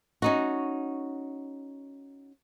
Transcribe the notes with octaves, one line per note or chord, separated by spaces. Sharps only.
C#4 D#4 F#4